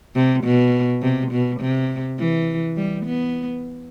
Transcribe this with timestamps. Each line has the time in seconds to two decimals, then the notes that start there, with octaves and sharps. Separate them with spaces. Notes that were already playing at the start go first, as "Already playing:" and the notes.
0.15 C3
0.44 B2
1.02 C3
1.32 B2
1.60 C3
2.18 E3
2.76 G3
3.06 B3